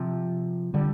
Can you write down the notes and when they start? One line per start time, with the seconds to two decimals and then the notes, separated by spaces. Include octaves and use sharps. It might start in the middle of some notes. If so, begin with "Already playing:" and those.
Already playing: C3 F3
0.74 D3 G3